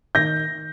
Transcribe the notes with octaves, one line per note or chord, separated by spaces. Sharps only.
D#3 G6 A#6